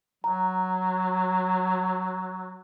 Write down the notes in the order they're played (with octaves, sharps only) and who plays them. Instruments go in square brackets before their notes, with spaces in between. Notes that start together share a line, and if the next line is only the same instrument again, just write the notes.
[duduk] F#3 [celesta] A#5